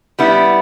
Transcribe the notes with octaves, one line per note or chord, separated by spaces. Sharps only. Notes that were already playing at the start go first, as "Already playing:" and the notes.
G3 B3 E4